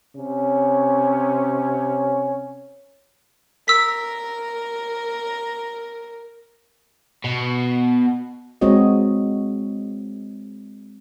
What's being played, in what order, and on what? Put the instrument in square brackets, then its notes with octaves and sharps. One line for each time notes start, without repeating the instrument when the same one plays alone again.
[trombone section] C3 C#4
[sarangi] A#4 [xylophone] E6 B6
[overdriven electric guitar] B2
[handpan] G#3 C4 F#4 C#5 D#5